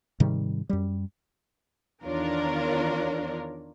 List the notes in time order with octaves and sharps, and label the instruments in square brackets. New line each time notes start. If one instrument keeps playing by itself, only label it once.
[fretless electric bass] G#2 C3 D#3 G3
F#2 G3
[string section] E2 D#3 D4 F4 A#4 C#5